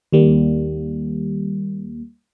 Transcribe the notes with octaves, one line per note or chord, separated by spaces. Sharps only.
D#2 G3 A#3